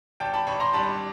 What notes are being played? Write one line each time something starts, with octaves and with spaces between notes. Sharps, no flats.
G#1 G5 A5
A5 B5
G#1 B5 C#6
A#5 C6
G2 A5 B5